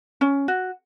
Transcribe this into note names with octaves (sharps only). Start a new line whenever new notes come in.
C#4
F#4